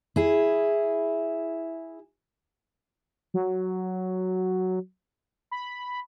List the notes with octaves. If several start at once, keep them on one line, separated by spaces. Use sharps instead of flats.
E4 G#4
F#3
B5